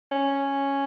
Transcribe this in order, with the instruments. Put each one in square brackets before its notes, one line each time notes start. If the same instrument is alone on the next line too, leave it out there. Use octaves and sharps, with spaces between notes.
[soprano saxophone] C#4